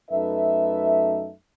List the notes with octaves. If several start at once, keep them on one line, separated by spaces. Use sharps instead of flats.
F#2 A3 D#4 A4 B4 E5